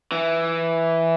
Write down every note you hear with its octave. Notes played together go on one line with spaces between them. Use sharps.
E3